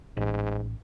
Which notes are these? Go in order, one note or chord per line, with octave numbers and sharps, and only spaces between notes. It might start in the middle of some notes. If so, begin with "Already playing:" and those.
A1 G#2